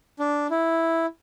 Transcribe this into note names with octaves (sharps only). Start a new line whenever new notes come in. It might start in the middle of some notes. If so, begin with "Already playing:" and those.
D4
E4